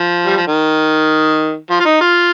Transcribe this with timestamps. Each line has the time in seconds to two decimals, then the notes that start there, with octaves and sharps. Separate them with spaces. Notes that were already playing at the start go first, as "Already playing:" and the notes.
Already playing: F3
0.26 G3
0.37 F3
0.47 D#3
1.70 F3
1.80 F4
1.85 D#4
2.01 F4